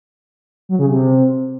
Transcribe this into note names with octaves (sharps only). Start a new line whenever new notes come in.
F#3
C#3
C3